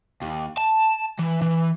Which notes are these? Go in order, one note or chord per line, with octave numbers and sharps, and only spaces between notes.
D#2
A5
E3
E3